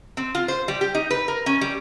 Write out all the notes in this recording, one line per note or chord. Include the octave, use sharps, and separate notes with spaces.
C4
F4
C5
G3
G4
D#4
B4
A#4
C#4
G3